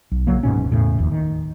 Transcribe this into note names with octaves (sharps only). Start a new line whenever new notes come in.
B1
A#1 C#3 F#3 A#3
D1 G#2 B2 C#4
E2 A2 C#3
F1 D#2
D#3